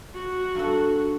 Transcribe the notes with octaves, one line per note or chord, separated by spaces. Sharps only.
F#4
G2 D#4 A4